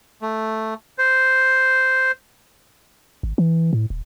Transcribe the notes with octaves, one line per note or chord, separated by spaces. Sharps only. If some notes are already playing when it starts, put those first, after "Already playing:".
A3
C5
G#1
E3
A2
D#1